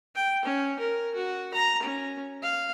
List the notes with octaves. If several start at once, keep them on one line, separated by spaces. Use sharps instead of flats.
G5
C#4
A#4
F#4
A#5
C#4
F5